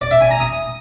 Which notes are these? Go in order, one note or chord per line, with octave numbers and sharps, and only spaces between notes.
D5
E5
G#5
A#5
D#6